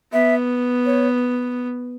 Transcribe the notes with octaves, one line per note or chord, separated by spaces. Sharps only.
B3 E5
C#5